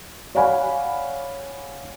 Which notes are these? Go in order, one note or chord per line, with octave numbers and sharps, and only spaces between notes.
C#5 D5 F5 F#5 G#5 B5